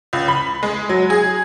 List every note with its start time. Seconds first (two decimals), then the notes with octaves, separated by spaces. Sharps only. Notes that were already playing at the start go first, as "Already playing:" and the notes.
0.13 C#2
0.28 B5
0.63 G#3
0.89 F#3
1.10 G#4